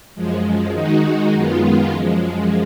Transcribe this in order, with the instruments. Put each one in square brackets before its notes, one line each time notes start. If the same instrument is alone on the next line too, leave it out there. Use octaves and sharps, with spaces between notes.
[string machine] F#2 F3 G#3
D#3 G#3 D#4 F#4
F#2 D#3 G#3 B3 F4
F#2 F3 G#3